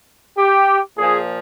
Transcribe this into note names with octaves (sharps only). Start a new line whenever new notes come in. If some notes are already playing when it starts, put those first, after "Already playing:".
G4
A#2 F3 G#4